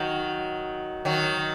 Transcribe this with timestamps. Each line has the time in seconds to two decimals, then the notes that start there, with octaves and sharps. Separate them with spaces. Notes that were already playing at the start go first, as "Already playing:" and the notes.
Already playing: D#3 F#3
1.05 D#3 F#3